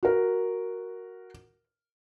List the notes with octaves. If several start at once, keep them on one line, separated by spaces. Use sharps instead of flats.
F#4 A#4